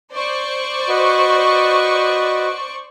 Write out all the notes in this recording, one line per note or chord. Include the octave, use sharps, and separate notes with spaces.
C5 D5 C#6
F#4 B4 D#5